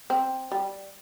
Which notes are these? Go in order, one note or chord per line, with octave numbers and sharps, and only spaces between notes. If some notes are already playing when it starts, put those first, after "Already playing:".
C4
G3